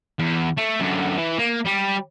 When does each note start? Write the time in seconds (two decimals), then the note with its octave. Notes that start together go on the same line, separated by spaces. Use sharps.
0.19 E2
0.58 A3
0.80 F#2 D3
1.17 E3
1.38 A#3
1.65 G3